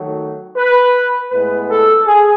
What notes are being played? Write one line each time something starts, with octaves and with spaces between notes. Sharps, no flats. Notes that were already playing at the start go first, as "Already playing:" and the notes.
Already playing: D#3 F#3 A3
B4
A2 G#3 B3 B4
A4
G#4